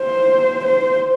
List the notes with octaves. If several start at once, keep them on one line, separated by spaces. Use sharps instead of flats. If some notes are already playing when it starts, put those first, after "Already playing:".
Already playing: C5
C5